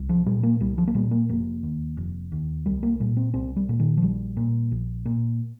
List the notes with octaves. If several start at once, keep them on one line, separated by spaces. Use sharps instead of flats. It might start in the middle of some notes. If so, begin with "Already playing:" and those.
Already playing: C2
F3
A#2 G3
A#3
C2 G3
F3
A#3
A#2 G3
A#3
F1 A#3
D#2
F1
D#2
C2 G3
A#3
A#2 G3
C4
C2 C4
G3
A#2
D#3
F3
A#1 G3
A#2
A#1
A#2